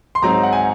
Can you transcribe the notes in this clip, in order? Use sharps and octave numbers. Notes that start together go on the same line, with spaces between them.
C6
G#2 F#3 C4 D#4 A#5
F#5
G#5